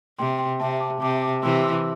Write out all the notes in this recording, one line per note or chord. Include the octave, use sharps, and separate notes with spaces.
C3 G5 C6
G5 C6
C3 E5 A5
A5 D6
C3 A5 D6
A5 D6
C3 E3 C6 E6
C6 E6